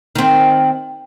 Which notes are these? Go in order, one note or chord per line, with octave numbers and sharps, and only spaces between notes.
D#3 C4